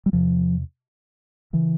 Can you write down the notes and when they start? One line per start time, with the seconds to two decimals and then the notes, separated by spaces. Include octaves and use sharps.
0.06 G3
0.13 E2 C3 F3
1.53 C#3 E3